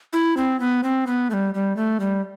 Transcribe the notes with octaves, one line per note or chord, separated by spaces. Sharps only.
E4
C4
B3
C4
B3
A3
G3
G3
A3
G3